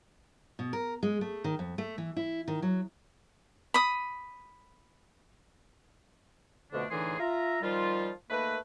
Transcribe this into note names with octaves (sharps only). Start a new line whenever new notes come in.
B2
A#4
G#3
A3
D#3
F2
A3
E3
E4
D#3
F#3
B5 D#6
F2 B2 D3 A3 D4
A2 D3 E3 D#4 G#4 C6
F4 E5 A#5
D#3 F3 G3 F4
D#3 A3 A#3 B4